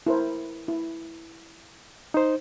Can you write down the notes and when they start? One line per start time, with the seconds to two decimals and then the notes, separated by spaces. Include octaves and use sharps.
0.06 E4 A#4 C5
0.68 E4
2.14 D#4 C5